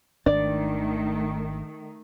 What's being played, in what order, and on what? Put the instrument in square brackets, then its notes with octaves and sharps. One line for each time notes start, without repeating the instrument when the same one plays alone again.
[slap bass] G#1 D4 [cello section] D#3 A3 [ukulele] D5